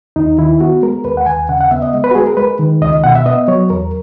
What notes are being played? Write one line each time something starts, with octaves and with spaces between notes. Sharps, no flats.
D#2 D#4
D#3 E4
B3 F#4
G#3 A#4
D#2 B4
F#5
D#2 G#5
C#3 F#5
F#5
B3 E5
D#5
G#3
B4
F#4
G#3 G#4
A#4
G#3 B4
D#3
C#2 D#5
B2 F#5
E5
B3 D#5
F#3 C#5
E2 A#4